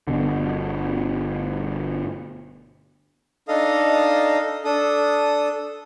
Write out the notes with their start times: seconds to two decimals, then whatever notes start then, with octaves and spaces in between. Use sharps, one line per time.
0.08 G1 B2 D3
3.48 D4 D#4 A4 D#5 F5 D#6
4.65 D4 A4 D#6